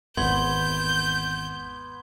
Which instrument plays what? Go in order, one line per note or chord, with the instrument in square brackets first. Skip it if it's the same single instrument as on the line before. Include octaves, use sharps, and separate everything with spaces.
[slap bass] G#1 E2 [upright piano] B3 [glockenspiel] C6 G#6 G7 [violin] G6